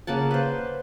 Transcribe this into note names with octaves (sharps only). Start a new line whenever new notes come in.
C#3 A#3 F#5 A5
B4 C5